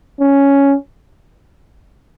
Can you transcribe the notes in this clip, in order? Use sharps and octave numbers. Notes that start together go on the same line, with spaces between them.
C#4